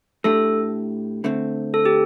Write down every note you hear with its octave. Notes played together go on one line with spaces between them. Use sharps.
A2 A3 D4 G4 A4
D3 A3 C4
A4
G4